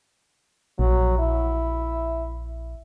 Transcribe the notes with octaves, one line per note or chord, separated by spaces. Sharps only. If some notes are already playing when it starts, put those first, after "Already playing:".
A#1 F#3
E4